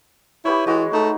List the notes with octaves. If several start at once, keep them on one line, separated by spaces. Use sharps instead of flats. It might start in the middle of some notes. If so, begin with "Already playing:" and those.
E4 G4 B4 C#5
E3 G#3 F#4
A3 D#4